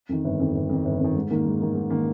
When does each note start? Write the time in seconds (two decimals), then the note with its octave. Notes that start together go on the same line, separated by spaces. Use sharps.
0.09 F2 D#3
0.24 G1
0.40 F2 D#3
0.55 G1
0.69 F2 D#3
0.85 G1
1.00 F2 D#3
1.16 G#2
1.30 D#3 A#3
1.46 G#2
1.60 D#3 A#3
1.75 G#2
1.90 D#3 A#3